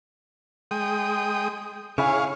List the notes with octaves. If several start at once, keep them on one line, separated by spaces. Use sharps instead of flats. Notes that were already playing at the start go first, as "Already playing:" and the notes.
G#3 G5 D#6
C#3 E4 G#4 C#5 F5 G#5